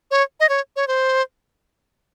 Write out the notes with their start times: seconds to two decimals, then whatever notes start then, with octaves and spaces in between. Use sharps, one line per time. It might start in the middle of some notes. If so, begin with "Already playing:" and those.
0.11 C#5
0.40 D#5
0.49 C#5
0.76 C#5
0.88 C5